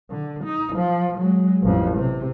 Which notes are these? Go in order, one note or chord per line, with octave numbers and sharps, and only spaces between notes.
D3
D#4
F3
F#3 G#3
A1 F2
C3